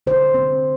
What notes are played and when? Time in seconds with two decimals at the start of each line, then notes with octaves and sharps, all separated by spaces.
0.07 D3 C5
0.34 C4